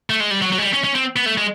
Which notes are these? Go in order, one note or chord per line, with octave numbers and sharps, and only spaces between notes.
A3
G#3
G3
F#3
F#3
G#3
G3
C#4
C#4
C4
B3
A3
G#3